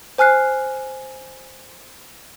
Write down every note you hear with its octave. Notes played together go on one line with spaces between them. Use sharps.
C5 G#5 F6 F#6 C7